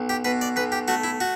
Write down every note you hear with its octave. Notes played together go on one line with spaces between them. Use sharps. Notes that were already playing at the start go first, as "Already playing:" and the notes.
Already playing: B1
G4
B2 B4
D5
B1 B4
G4
A3 F#4
E4
F#4